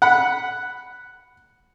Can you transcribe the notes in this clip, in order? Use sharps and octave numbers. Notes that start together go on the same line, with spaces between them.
F#5 B5